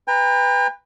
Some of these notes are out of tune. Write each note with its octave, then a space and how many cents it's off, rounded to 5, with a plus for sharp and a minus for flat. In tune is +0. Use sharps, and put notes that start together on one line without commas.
B4 +5 G5 +40 A#5 -10